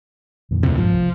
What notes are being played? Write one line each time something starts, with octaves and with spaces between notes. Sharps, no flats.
F2 A#2 D#3
D2 C3
A#1 G#2 F3
C2